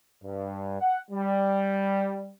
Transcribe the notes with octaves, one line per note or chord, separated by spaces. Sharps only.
G2
F#5
G3